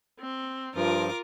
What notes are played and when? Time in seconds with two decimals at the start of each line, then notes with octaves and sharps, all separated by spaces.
0.18 C4
0.75 G2 F3 F4 A#4 D6